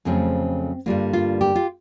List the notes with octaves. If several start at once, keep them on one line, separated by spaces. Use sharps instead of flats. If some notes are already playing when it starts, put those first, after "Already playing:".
F2 C#3 F#3 A3 C4
G2 D3 G3 A#3 F4
F4
G4
F4